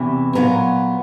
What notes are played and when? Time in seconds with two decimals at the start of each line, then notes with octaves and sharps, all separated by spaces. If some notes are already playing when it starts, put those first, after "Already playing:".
Already playing: E2 C3 E3
0.35 A#2 F#3 B3 A#5